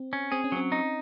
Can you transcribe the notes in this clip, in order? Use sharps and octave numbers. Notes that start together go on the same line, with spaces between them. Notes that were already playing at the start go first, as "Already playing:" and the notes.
Already playing: C4
C#4
C4 G#4
C#4
F#3 C4
D#4